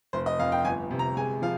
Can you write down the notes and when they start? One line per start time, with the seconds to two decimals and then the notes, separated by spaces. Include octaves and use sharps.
0.13 F1 C5
0.26 D#5
0.39 F2 F5
0.52 G5
0.65 G1 G#5
0.91 C3
0.99 A#5
1.17 G#3 G#5
1.42 F3 F5